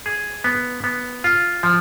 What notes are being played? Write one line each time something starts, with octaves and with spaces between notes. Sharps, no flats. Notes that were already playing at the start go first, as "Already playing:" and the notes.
G#4
B3
B3
F4
F3